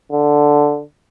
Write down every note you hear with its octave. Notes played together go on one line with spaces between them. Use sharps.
D3